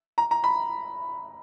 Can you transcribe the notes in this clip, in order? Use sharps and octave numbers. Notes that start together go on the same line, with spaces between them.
A#5
A#5
B5